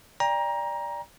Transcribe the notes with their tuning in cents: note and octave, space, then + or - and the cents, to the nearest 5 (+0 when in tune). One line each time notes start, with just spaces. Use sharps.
D5 +0 G5 +35 A#5 +15